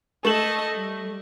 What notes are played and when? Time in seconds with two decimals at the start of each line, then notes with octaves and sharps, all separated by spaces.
0.25 A3 A4 D#5 E7 F#7
0.74 G3